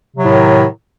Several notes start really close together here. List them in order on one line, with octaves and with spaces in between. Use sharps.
C3 F#3 A2 D#3